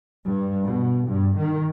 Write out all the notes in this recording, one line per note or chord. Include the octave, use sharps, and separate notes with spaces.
G2
B2
G2
D#3